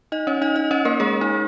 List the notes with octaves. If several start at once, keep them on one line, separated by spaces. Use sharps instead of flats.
D#4 D#5
C#4 C#5
D#4 D#5
D#4 D#5
C#4 C#5
A#3 A#4
G#3 G#4
D#4